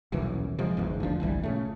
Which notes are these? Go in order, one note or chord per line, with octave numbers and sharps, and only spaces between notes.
D#1 B1 F#2 E3
C3 F3 G#3
G1 E2 G#2
F1 D2 F3 D4
G1 C2 E3 G3
A#2 C#3 A3